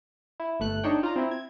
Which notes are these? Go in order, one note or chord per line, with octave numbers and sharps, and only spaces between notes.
E4
G1 A3 F#6
D4 D#4 C#5 G5
F4 A#5
C4 E4
G#6